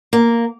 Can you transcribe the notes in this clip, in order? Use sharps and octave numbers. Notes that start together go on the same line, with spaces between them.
A#3